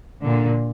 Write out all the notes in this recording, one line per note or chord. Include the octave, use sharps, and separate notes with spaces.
A#2 D3